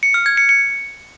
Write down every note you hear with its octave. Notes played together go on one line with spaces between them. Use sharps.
C#7
F6
G#6
C#7
C#7